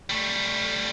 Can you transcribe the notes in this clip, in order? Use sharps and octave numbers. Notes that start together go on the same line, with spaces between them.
G3 A3